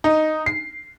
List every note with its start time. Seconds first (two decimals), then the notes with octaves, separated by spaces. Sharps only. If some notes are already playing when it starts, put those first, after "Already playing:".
0.04 D#4
0.46 C7